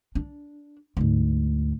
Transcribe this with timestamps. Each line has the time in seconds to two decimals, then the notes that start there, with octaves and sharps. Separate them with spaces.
0.15 D4
0.97 D2 G#2